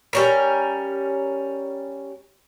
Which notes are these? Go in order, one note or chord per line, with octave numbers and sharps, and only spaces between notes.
G3 C#4 A#4